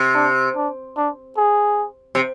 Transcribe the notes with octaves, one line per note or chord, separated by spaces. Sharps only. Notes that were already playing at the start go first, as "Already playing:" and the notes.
Already playing: C3
D4
D4
D4
G#4
C3